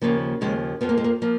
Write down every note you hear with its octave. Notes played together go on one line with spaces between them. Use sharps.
D#2 C#3 F3 A#3
D#2 C#3 F3 G#3
F2 F3 B3
A#3
G#3
A#3
F3 A#3